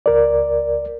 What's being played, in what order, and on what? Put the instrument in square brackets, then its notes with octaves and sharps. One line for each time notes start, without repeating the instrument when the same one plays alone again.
[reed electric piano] C#2 A#4 D5